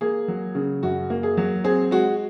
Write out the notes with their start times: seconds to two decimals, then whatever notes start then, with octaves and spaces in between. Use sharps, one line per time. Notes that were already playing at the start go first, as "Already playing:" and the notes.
0.01 A#3 G#4
0.28 F#3
0.55 C#3
0.83 F#2 F#4
1.10 A#3
1.23 G#4
1.37 F#3
1.64 C4 G#4
1.91 G#3 F#4